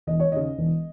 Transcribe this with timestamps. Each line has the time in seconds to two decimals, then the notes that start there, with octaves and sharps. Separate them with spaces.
0.07 E1 D#5
0.20 C#5
0.32 D#2 C#3 D#5
0.58 E1